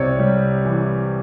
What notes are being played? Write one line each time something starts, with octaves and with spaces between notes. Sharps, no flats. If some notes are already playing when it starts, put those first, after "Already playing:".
Already playing: C2 C3 C#5 D5
G3
E3